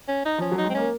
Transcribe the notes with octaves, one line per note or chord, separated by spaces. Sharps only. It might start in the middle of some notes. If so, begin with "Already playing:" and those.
C#4
D#4
F3 C#4
F#3
D#4
G#3
C4
A#3 C#4